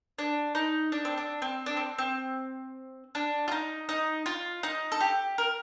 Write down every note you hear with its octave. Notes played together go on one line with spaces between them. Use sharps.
D4
D#4
D4
C4
D4
C4
D4
C4
C4
D4
F4
D#4
D#4
F4
D#4
A4
G4
A#4